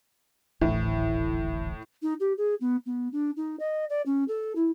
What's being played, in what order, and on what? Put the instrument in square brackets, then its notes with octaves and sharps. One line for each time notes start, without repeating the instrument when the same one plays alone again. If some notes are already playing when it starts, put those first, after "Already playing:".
[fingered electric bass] D1 G#1 E3 [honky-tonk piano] A2
[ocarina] D#4
G4
G#4
B3
B3
D4
D#4
D#5
D5
C#4
A4
E4